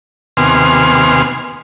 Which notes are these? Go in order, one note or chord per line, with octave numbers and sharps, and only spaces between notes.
D#2 C3 B3 G#5 C6 F6